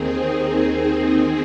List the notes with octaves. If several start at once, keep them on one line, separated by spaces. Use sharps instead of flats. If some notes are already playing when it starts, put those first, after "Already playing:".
Already playing: D#2 D#3 C4 D#4 G#4